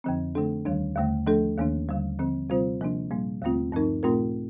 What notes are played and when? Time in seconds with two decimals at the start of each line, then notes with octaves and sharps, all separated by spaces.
0.04 F2 D3 F3 C4
0.35 D3 A3 D4 A4
0.65 D#2 D#3 G3 D4
0.96 D#2 D3 A3
1.27 F3 A3 D4 A4
1.58 D#2 D#3 A#3 D4
1.89 D#2 D3 G3
2.19 D3 F3 C4
2.50 C3 G3 C4 F4 C5
2.81 C3 F3 A#3 D4
3.11 A#2 G3 A#3
3.42 D#2 D3 A3 C4 F4
3.72 G2 F3 C4 D#4 A#4
4.03 A#2 A3 C4 F4 A#4